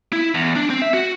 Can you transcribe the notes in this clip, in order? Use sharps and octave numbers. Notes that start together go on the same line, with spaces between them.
E4
E2
D4
C4
E5
F#4